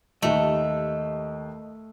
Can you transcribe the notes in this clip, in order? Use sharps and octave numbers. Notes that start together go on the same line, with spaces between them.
D#2 A3 G4 D#5 E5